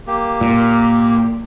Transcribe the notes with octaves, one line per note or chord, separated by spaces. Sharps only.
A#3 G4
A#2